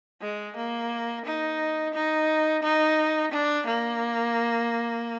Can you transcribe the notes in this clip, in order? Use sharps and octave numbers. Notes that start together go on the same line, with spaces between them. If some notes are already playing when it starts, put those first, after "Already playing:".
G#3
A#3
D#4
D#4
D#4
D4
A#3